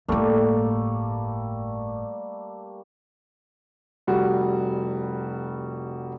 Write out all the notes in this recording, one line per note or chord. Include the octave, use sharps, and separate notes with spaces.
G1 A2 G3 A3 A#3
F1 G3 F#4